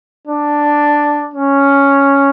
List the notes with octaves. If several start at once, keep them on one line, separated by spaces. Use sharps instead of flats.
D4
C#4